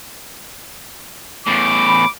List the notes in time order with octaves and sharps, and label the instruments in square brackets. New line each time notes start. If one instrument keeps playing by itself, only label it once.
[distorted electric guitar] E2 A2 [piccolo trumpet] D6
[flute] B5